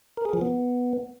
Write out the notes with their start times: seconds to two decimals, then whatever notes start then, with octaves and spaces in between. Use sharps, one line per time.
0.17 A#4
0.25 G#4
0.33 F3
0.41 B3